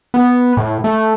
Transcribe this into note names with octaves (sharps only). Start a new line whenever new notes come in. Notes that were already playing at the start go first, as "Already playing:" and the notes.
B3
A2
A3